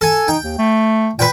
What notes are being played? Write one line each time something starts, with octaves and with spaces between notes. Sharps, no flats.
A4 G#5
D#4 G5
D#2
A3
A#2 B4 G5